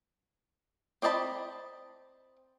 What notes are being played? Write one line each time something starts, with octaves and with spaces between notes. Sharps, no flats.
C4 D5 D#5 A5 B5